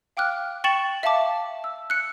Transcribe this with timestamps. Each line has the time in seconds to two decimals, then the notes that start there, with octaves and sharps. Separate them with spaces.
0.17 F5 G5 D6 F6 F#6
0.64 G5 C#6 A6 C#7 E7 F#7
1.03 E5 F5 G5 A5 D6
1.64 E6
1.90 F#6 C#7